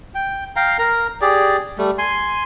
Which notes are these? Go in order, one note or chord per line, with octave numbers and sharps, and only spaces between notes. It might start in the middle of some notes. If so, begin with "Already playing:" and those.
G5
F5 G5 A#5
A#4 A#5
G4 G#4 D5
G3 A3
G#5 C6